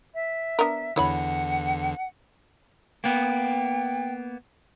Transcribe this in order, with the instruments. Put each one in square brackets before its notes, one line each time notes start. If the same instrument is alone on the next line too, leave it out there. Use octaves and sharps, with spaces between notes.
[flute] E5
[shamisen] B3 D4 A#4
[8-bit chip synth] E2 D3 [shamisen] E4 C#5 B5 [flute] F#5
[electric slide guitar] A#3 B3 [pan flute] G5